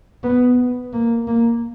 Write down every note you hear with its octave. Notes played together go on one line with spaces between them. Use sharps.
B3
A#3
A#3